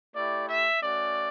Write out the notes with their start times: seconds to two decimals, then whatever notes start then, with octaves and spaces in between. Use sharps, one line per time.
0.14 A3 E4 G4 D5
0.48 E5
0.81 A3 C#4 F#4 D5